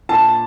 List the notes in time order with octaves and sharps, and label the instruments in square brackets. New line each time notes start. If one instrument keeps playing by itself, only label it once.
[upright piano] A#2 A5